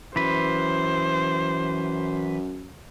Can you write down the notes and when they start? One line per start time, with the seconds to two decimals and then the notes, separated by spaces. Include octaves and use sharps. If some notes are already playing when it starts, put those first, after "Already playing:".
0.16 F#2 E3 B4 C5